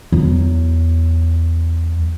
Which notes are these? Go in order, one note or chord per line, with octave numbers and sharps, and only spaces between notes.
E2 F#3